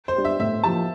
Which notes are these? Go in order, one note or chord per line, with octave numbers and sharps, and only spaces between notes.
C5
G3 D4 G4
E5
A2 E5
F3 A#3 E4 G4 A5